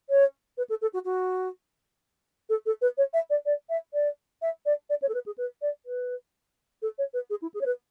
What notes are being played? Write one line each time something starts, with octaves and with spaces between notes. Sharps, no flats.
C#5
B4
A4
A4
F#4
F#4
A4
A4
B4
C#5
E5
D5
D5
E5
D5
E5
D5
D5
C#5
A4
B4
G#4
B4
D5
B4
A4
C#5
B4
G#4
E4
G#4
C#5
B4